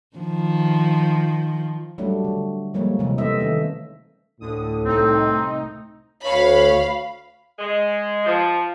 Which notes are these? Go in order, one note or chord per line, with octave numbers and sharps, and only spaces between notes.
D#3 F3
F#3 G3 A3 D4
D3
F3 G3 G#3 A#3 C#5
C3 E3
A3 C4 C5 D#5 E5
D#3 A3 C#4
D2 A2 D3 D#6
C2 A3 C4 D#4
D2 C#5 F5 B5
G#3
F3